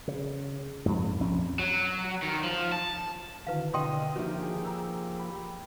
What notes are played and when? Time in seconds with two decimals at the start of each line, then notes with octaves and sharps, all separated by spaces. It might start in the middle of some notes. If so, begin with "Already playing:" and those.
0.08 C#3
0.86 F2 G#2
1.20 A#1 F2 C#4
1.59 F#3
2.23 D#3
2.43 F3
2.72 A5
3.47 D3 D#3 E4 F#4 B4 F5
3.73 C2 B2 D3 D#5 G5 C6 D#6 D#7
4.16 G2 D#3 F3 A#3 F#4 G4 E5
4.42 G#4 G#5
4.64 A#5 E6
5.20 G5 B5